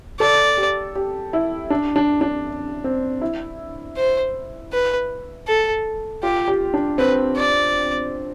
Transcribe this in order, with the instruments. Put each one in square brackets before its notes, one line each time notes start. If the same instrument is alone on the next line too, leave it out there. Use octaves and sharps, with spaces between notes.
[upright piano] A4 [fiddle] D5
[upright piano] G4
G4
E4
D4
D4
D4
C4
E4
[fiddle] C5
B4
A4
[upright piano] F4 [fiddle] G4
[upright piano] G4
D4
[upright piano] C4 [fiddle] B4
[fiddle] D5